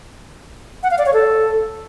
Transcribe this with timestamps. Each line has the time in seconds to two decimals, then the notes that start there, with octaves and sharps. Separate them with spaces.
0.83 F#5
0.91 F5
0.98 D5
1.06 C#5
1.14 A4